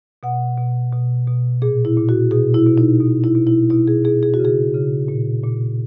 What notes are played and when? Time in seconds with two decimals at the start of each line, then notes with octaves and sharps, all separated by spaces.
0.23 B2 F#5
0.58 B2
0.93 B2
1.27 B2
1.62 A#2 G#4
1.85 E4
1.97 A#2
2.09 F#4
2.31 B2 G#4
2.54 E4
2.66 B2
2.78 D#4
3.01 B2
3.24 E4
3.35 B2
3.47 E4
3.70 B2 E4
3.88 G#4
4.05 B2 G#4
4.23 G#4
4.34 F#4
4.40 C#3
4.45 G#4
4.74 C#3
5.09 A#2
5.43 A#2